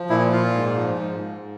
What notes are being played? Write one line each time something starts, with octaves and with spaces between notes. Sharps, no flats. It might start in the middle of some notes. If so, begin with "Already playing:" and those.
Already playing: F3
A#2 E4
A#2 F4
G#2
F3
G#2
G#2